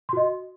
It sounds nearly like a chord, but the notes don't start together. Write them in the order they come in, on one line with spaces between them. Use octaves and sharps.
C6 F#4 D#5